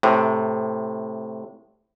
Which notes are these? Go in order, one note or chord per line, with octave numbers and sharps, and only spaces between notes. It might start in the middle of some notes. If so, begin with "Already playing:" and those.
A2 C3